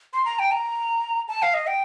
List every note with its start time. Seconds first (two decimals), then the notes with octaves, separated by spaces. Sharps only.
0.13 C6
0.25 A#5
0.39 G5
0.51 A#5
1.28 A5
1.42 F5
1.54 D#5
1.67 G5